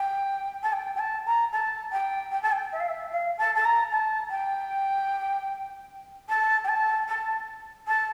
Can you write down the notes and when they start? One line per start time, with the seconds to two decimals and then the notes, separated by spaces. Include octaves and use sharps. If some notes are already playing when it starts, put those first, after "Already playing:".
Already playing: G5
0.63 A5
0.73 G5
0.95 G5
0.99 A5
1.26 A#5
1.52 A5
1.92 G5
2.31 G5
2.43 A5
2.52 G5
2.72 E5
2.80 F5
2.88 E5
3.12 F5
3.38 A5
3.55 A5
3.65 A#5
3.91 A5
4.30 G5
6.29 A5
6.64 G5
6.68 A5
7.08 A5
7.88 A5